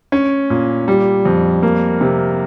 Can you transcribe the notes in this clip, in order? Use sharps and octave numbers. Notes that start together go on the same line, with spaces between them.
C#4
A#2
G3
F2
A#3
C3